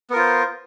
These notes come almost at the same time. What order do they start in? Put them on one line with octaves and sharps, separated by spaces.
B3 A#4 F4 C5